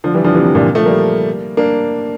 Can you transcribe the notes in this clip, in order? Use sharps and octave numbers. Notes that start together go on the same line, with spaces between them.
D3 F3
E3 G3
D3 F3
C3 E3
C3
A#2 D3
F3 A3
G3 A#3
A#3 D4